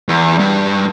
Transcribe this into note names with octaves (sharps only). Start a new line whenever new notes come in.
E2
G2